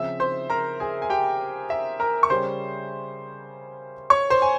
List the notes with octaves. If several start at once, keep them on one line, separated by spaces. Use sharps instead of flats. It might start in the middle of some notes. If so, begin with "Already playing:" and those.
Already playing: C#3 F3 C4 E5 E6
C5 C6
A#4 A#5
G#4 G#5
G#5
G4 G5
E5
A#4 A#5
C#6
C#3 G3 C#4 C5 C6
C#5 C#6
C5 C6
G#5